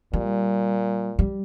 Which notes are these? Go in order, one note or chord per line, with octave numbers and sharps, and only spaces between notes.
A#2 G3
G3